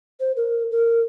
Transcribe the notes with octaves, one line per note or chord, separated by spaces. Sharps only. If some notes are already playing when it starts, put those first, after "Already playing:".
C5
A#4
A#4